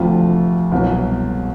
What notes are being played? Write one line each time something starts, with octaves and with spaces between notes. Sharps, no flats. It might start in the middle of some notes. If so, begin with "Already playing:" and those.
Already playing: D2 C3 F3 F4
C2 B2 F#3